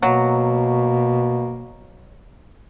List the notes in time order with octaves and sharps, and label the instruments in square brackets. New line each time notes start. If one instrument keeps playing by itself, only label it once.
[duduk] B2 [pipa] F#3 [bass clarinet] A#3